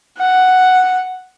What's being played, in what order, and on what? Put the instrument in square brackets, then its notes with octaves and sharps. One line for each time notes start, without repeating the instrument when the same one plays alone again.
[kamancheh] F#5